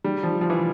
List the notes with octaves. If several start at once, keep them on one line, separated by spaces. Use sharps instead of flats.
G3
F3
F3
E3